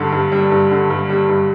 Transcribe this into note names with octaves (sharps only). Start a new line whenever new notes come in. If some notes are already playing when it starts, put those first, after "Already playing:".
Already playing: G2 D3 G3
G2
G3
G2
D3
G2
G3
G2